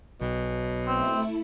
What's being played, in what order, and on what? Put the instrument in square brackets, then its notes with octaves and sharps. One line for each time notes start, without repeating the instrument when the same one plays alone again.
[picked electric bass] B1 [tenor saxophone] B2
[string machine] A3 E4 [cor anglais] C4